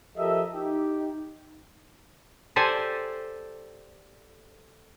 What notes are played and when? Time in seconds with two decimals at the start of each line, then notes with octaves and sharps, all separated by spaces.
0.17 F3 G4 A4 A#4 D#5 E5
0.54 D#4 G4
2.56 G4 A4 C5 D5 G#5